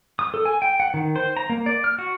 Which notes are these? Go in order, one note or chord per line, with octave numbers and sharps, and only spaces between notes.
D#6
A4
G#5
G5
F#5
D#3
C5
A#5
A#3
D5
F6
F#4